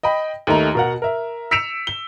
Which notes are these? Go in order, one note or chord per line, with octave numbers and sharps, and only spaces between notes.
D#5 G5 B5
D#2 A3 D#4 A#5
B2 A#4 F#5
A#4 E5
E6 B6 C#7 D7 E7 F7
G7